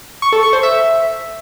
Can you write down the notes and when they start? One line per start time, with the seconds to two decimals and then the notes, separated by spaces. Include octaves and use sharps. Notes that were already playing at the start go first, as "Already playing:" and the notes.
0.22 C#6
0.32 A4
0.43 C#6
0.53 C5
0.63 E5